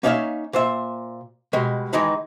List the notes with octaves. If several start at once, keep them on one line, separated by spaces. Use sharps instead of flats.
A#3 C#4 D#4 C#5 E5 F5
A#2 C5 E5
B2 G3 G#3
D#3 E3 G#3 D#4 B5